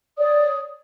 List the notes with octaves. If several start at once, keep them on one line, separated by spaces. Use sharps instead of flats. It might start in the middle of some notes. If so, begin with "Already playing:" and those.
C#5 D5 D#6